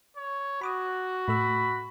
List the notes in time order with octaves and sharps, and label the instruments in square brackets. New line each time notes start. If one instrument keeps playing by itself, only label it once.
[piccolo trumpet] C#5
[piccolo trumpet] F#4 [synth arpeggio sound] B5 D6 D#6
[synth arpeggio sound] A2 A3 E6 [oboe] B5